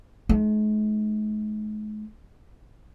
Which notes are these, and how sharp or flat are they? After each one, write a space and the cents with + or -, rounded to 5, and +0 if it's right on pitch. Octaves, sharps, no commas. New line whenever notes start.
G#3 +45 D#4 +0